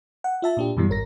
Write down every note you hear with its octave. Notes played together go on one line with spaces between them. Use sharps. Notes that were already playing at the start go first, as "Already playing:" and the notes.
F#5
F4 E5 A5
A#2 D4 G4
F#2 B2 E3 G3
G#1 A#4 A#6